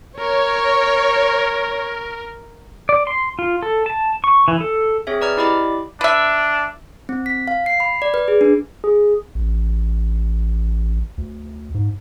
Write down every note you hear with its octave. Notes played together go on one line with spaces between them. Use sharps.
A#4 C#5
D5
C6
F4
A4
A5
C#6
E3
A4
C4 G#4 C#5 E5
B4 D5 A#5 F6 G#6
E4 G4 D5 D#5 B5 D6
D4 B4 E5
C4
B6
F5
C7
B5
D5
B4
G#4
D4
G#4
A1
D2
G#2